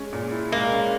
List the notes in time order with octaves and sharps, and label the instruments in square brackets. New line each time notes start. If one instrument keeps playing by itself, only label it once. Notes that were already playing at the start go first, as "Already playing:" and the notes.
Already playing: [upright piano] G#3 C#4
A#2
E4
[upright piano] G#3 [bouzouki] A#3
[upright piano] C#4